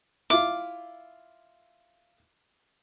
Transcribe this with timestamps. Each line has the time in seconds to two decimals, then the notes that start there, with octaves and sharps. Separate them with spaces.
0.30 E4 F4 D6